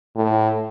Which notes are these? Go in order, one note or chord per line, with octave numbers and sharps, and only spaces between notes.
A2